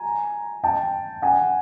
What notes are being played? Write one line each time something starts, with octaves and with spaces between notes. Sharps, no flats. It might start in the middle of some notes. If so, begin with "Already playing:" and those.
Already playing: G#5 A#5
G5 A5
F#5 G#5